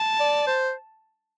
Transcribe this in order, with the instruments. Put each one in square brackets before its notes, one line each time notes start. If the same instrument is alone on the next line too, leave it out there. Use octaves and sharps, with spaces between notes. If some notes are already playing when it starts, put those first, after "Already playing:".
Already playing: [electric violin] A5
[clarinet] D5
C5